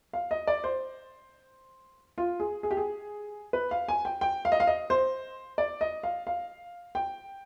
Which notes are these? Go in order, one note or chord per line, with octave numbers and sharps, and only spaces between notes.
F5
D#5
D5
C5
F4
G#4
G#4
G4
G#4
B4
F5
G#5
G5
G5
F5
D#5
F5
D#5
C5
D5
D#5
F5
F5
G5